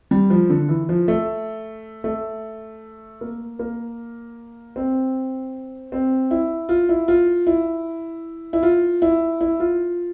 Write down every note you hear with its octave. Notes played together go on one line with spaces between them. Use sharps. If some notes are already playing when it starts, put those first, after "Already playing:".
G3
F3
D3
E3
F3
A3
A3
A#3
A#3
C4
C4
E4
F4
E4
F4
E4
E4
F4
E4
E4
F4